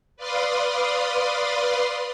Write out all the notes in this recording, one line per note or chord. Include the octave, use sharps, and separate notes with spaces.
B4 D5 F5 C6 D#6 F6